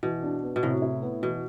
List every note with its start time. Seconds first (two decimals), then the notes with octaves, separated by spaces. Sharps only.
0.03 B2 E3
0.23 D4
0.43 B3
0.56 B2
0.63 A2 C3
0.82 E4
1.02 B3
1.22 B2 E3